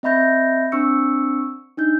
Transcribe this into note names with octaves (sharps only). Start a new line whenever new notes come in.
C4 D#5 E5 B5 G6 A#6
C4 D4 C#6 E6 C#7
D4 D#4 G6